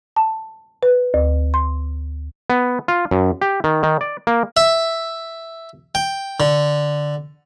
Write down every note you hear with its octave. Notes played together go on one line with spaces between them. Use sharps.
A5
B4
D2
C6
B3
F4
F#2
G4
D#3
D#3
D5
A#3
E5
G5
D3